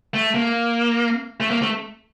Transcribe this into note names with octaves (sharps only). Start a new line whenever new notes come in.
A3
A#3
A3
A#3
A3